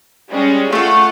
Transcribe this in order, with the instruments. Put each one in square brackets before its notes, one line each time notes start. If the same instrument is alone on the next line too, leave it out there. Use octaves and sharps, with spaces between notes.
[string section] G3 G#3 C#4
[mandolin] A3 A4 [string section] F4 F5 F#5